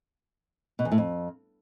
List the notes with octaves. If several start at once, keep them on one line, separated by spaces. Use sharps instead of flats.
B2
E2
A2
F2